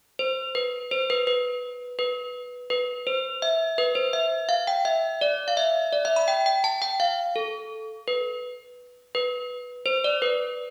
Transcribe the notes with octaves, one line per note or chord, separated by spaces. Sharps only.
C5
B4
C5
B4
B4
B4
B4
C5
E5
B4
C5
E5
F5
G5
E5
D5
F5
E5
D5
E5
B5
G5
G5
A5
G5
F5
A4
B4
B4
C5
D5
B4